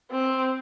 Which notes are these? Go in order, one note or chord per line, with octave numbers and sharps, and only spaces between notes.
C4